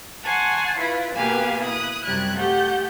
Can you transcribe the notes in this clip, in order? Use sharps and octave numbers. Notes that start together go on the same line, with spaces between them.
F#5 G#5 A5 C6 C#6
E4 F4 B4
B2 A#3 B3 G4 F5 G#5
E4 D#6 F#6
F#2 C3 G3 F#6 G#6
A3 G4 F#5 G6